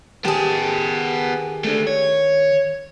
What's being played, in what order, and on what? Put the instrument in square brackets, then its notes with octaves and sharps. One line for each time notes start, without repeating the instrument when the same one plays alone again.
[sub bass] D#3 [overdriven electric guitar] B3 A5 [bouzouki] G4 G#4
[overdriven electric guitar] A3 D4
C#5